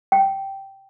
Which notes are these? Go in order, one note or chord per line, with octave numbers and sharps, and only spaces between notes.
G5